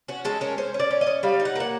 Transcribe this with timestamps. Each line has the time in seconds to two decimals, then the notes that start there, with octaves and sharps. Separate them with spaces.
0.08 C#4 F#4
0.25 G#3 A4
0.41 C#4 A#4
0.58 C#4 C5
0.74 C#4
0.80 D5
0.91 C#4
1.01 D#5
1.07 C#4
1.23 G3 F5
1.40 D#4
1.45 F#5
1.56 A#3 F#5